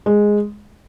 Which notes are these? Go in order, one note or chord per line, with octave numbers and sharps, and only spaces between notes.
G#3